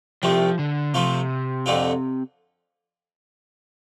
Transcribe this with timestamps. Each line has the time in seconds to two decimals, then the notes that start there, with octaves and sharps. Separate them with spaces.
0.23 C2 C3 F3 A3 C4
0.59 D3
0.94 C3 F3 A3 F4
1.66 F2 D3 A3 C4 F4